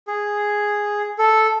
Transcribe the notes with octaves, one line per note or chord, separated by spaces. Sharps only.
G#4
A4